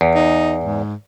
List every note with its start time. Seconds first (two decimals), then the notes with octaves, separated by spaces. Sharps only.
0.01 E2
0.15 D#4
0.64 G#2